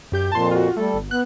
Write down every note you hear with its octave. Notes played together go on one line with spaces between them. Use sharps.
F#2 G4 G6
F2 A#2 A5 C6
F4 F#4
G3 A3 A4
G1
B3 F#6